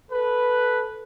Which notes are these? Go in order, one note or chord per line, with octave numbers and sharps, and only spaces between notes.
A4 B4